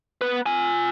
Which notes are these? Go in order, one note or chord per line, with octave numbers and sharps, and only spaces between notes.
B3 B4
F4 G#5